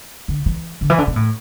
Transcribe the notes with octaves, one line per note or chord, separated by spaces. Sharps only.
D3
E3
D3
E3
D3
B2
A2